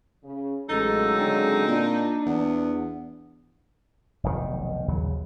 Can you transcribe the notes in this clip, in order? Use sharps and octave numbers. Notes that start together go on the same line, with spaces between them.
C#3
A1 C#3 F#3 G#3 D#4 A4
D3 C4
A#2 D4
E2 B3
F1 B1 G#2 D#3
A#1 D#2 C#3 F#3